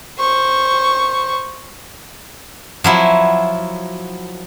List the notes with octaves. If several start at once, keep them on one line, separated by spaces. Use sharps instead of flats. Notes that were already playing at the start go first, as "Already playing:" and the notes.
C5 C#6
F3 F#3 E4